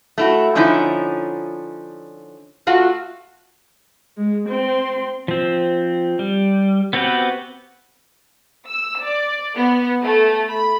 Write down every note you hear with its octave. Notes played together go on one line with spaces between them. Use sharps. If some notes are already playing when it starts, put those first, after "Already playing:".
A3 E4 F#4
D3 F3 C#4 D#4 E4
A3 F4 F#4
G#3
C4 C6
F3 C4
G3
B3 C4 F#4 G4 B4
E6
D5
B3
A3
B5